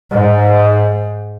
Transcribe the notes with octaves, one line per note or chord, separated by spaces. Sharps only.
G#2